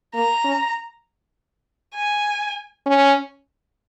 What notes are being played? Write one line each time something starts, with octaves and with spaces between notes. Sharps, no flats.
A#3 A#5
C#4
G#5
C#4